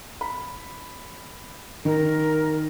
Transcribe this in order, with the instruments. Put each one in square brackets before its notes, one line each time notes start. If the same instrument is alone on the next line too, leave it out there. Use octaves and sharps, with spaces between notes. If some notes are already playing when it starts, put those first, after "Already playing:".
[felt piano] B5
[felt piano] D#3 [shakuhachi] A#4